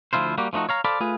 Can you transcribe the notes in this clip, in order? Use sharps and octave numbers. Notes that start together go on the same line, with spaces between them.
D2 F3 E4 F4 C5
G3 A#3 F#4 G4
F3 A3 D4 D#4 F#4
C#5 F5 A#5
A4 C5 D5 F5 B5
A3 F4 G#4 B4